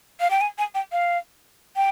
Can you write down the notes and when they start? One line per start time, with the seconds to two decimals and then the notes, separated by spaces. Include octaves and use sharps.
0.20 F5
0.30 G5
0.41 G#5
0.58 G#5
0.75 G5
0.92 F5
1.76 G5